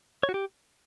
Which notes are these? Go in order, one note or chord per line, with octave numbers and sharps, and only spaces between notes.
C#5
F#4
G4